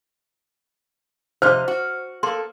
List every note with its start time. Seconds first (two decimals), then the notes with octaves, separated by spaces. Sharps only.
1.42 C3 F3 C5 D#5 F6
1.68 F#4
2.23 A#3 A4 C6